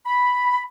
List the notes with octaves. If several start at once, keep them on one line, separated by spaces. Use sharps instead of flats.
B5